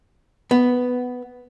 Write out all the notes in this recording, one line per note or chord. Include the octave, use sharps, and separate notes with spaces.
B3